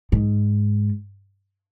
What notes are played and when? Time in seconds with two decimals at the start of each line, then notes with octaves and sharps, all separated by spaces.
0.12 G#2